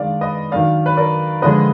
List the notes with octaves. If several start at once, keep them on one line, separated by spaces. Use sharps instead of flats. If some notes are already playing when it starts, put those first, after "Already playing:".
Already playing: D#3 G#3 D4 D5 F5
B4 D#5
D#3 F#3 D4 D5 F5
B4
A#4 D5
D3 F3 G#3 D4 B4 D#5